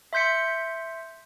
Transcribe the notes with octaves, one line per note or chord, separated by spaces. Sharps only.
E5 C6 G6 B6 C#7